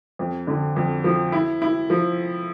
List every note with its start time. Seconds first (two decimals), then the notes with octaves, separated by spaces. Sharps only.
0.19 F2
0.47 D3
0.76 F2
1.04 F3
1.32 E4
1.62 E4
1.90 F3